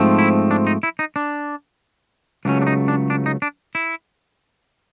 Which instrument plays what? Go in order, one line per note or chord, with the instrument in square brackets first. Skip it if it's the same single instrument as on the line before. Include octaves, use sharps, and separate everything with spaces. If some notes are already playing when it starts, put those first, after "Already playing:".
Already playing: [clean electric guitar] G#2 F3 A3 C4
E4
D4
D#4
E4
D#4
D4
C#2 C#3 F#3 A3 C#4 D4
D4
D#4
D4
D4
D#4
D4
E4